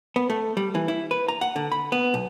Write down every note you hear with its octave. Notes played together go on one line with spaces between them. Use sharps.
B3
A3
G3
E3
E4
B4
A#5
F#5
D3
B5
B3
B1